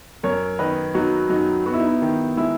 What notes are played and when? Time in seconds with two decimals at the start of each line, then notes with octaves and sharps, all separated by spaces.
0.23 F#2 A#4 C#5
0.59 D#3 B4 D#5
0.95 F#3 D#4 F#4
1.30 F#2 D#4 F#4
1.66 B3 F#4
1.74 E4
1.80 D#4
1.87 E4
2.02 D#3
2.37 G#3 E4